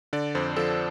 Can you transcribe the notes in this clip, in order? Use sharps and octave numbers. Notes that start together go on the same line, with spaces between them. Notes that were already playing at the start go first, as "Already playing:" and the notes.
D3 D5
F2 C5
F3 A4